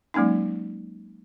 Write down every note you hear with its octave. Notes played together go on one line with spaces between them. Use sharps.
F#3 G#3 A#3 C#4 D#4